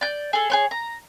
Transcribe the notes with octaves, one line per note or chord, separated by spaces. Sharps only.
D5 G6
G#4 A4
G#4 C5 C#5
A#5